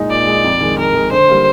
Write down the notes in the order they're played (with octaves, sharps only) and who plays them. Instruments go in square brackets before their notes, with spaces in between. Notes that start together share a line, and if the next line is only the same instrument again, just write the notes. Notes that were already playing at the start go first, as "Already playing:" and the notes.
Already playing: [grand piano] A#2 G#3 D#4
[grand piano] A#2 [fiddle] D5
[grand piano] G#3 D#4
F2
D#3 G#3
[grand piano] F2 [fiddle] A#4
[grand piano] D#3 G#3
[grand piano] D3 [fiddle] C5
[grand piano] G3 A#3